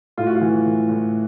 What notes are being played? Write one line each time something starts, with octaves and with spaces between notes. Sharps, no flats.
A2 F4
F#4
F4
E3
A2
A2